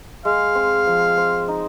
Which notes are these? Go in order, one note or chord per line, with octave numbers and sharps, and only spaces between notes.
G#3 F5
C4
F3
C4
D#4